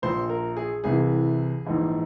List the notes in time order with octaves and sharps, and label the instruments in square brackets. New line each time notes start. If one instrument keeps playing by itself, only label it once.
[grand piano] A#1 A#2 C5
A#4
G#4
C2 C3 E3 G#4
A#1 G#2 E3